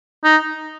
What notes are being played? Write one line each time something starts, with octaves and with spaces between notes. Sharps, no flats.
D#4